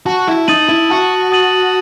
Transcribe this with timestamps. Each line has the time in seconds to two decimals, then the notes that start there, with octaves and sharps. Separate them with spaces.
0.06 F#4 A5
0.28 E4
0.48 D#4 D#6 A6 D#7 F#7
0.69 E4
0.90 F#4 A5
1.32 D#6 A6 D#7 F#7